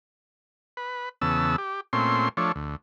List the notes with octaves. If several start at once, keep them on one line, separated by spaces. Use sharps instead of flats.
B4
E2 C#3 B3 A5 E6
G4
A#2 A3 C4 C#4 C6
F3 A3 D4 C#5
D2